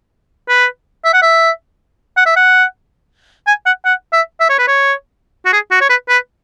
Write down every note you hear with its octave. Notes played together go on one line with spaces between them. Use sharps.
B4
E5
F#5
E5
F#5
E5
F#5
G#5
F#5
F#5
E5
E5
C#5
B4
C#5
F#4
G#4
F#4
C#5
B4
B4